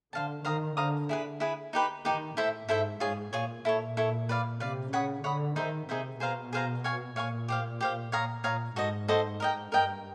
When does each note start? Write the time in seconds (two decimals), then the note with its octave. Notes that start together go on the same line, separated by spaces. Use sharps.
0.13 D3 C5 F5 A5
0.45 D#3 C5 F5 A#5 D#6
0.77 D3 C5 F5 A#5 D#6
1.09 E4 G#4 B4
1.40 E4 G#4 B4
1.73 D#4 G4 B4
2.05 D#3 D#4 G4 B4
2.37 A2 E4 A4 C5 E5
2.69 G#2 E4 A4 C5 E5
3.00 G#2 F4 G#4 C#5
3.32 A#2 F4 G#4 C#5
3.65 A#2 E4 A4 C#5
3.97 E4 A4 C#5
4.29 B4 D5 F5
4.60 C3 B4 D5 F5
4.93 C#3 C#5 F#5 B5 D#6
5.24 D3 C#5 F#5 B5 D#6
5.56 D#3 D#4 G#4 C5 E5
5.88 C3 D#4 G#4 C5 E5
6.20 B2 G#4 C5 F5 A#5
6.53 G#4 C5 F5 A#5
6.84 C#5 F5 G#5 C#6
7.16 A#2 C#5 F5 G#5 C#6
7.48 G4 C5 F5
7.81 G4 C5 F5
8.12 A#2 C#5 F5 A#5 D#6
8.44 A#2 C#5 F5 A#5 D#6
8.76 G#2 F#4 A4 C5 D#5
9.08 F#4 A4 C5 D#5
9.40 A#4 D#5 G5
9.72 G2 A#4 D#5 G5